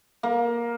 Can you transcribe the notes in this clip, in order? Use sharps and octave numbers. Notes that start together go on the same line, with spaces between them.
A#3